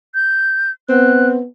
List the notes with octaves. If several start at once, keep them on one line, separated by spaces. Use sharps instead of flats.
G6
B3 C4 F#6